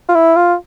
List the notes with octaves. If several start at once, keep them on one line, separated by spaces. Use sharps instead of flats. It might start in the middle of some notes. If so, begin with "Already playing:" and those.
F4
E4
F4